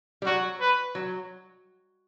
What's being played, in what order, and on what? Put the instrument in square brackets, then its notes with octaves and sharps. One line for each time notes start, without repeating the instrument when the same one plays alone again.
[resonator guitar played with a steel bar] G3
[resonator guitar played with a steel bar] F#3 [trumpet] F#4
[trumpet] B4
[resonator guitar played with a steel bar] F#3